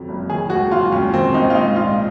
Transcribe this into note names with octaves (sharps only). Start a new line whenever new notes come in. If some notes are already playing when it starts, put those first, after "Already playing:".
Already playing: F2 D#3 F#3
F#1
D#3 G#4
D#2 F#4
F#3 F4
D#2 C#4
D#3 C4
D#2 D#4
F4
G#2 D#4
A#1 F4